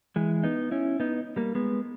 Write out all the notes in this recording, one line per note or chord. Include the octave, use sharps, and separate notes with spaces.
E3 G#3
B3 D#4
C#4 E4
B3 D#4
G3 A#3
G#3 B3